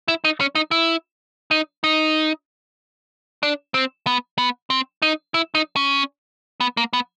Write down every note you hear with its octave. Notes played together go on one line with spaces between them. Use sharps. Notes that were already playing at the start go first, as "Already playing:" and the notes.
E4
D#4
C#4
D#4
E4
D#4
D#4
D4
C4
B3
B3
C4
D#4
E4
D#4
C#4
B3
A#3
B3